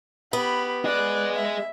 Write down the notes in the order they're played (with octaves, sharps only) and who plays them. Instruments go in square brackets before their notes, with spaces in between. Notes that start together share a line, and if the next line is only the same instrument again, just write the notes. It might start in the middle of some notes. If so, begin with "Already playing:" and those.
[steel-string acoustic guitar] B3 [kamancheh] G4 B5
[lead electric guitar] G#4 D#5 [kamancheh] D5 F#6
[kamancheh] E5